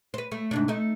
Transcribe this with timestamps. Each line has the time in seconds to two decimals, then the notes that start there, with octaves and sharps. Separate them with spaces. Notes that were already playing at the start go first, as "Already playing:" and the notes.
0.14 B4 C5
0.32 A3
0.51 G#2 C3 D4
0.68 A3 D#4